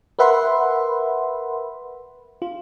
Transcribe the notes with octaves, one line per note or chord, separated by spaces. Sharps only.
A#4 B4 E5 F#5 B5 C6
F4